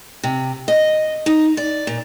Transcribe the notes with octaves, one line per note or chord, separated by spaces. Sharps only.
C3
D#5
D#4
D5
A#2